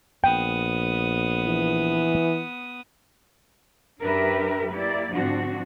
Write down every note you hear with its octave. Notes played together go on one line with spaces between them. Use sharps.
A#1 B3 G5 D#6
E3
F#2 D4 G4 A#4 B4 E5
A#3 E4 G4 D5
G#2 D3 F3 C4 D4 F#4